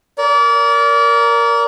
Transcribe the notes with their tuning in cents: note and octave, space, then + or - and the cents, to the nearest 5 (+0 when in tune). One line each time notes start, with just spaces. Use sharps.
A#4 +0 D5 -35